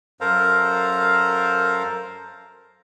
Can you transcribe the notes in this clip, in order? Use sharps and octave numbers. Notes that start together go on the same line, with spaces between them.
F#2 A4 A#4 C5 F5 A#5